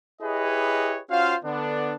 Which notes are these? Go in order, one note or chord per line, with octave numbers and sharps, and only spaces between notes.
E4 G4 G#4 B4 C#5 D#5
C#4 F4 F#4 C5 F5
D3 B3 D4